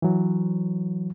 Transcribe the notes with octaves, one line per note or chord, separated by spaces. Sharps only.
E3 F#3